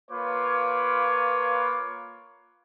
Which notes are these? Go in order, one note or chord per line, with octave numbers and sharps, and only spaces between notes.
A#3 F4 B4 C#5 D6